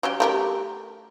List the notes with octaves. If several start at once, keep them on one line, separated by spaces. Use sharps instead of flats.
F#3 C#4 G4
A3 G4 A#4